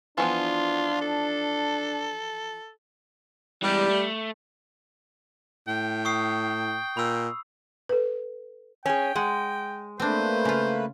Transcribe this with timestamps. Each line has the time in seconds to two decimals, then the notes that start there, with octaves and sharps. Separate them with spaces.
0.18 E3 F3 B3 D4 F4
1.01 A4
3.63 E3 G3 G#3
3.89 A3
5.68 A2 G5
6.05 C#6 D#6 C7
6.97 A#2 B5 E6
7.89 A4 B4
8.86 C#4 G#4 G5
9.16 G#3 F#5
10.00 A3 A#3 C4 D4 B4 C5
10.45 C#3 F4